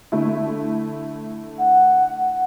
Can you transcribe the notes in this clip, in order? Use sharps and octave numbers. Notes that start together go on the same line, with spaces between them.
D3 A3 E4
F#5